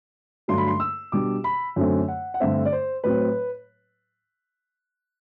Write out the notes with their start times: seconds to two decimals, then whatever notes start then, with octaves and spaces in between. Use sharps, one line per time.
0.48 G2 D3 F#3 A3 D4 C6
0.58 B5
0.67 C6
0.80 E6
1.12 B2 G3 D4 D6
1.44 B5
1.76 F#2 D3 F#3 A3 C4
2.08 F#5
2.34 F#5
2.40 G2 D3 A3 C4 E5
2.66 D5
2.72 C5
3.04 A2 F#3 C4 B4